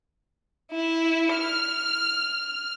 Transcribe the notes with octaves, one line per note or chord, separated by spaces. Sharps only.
E4
F6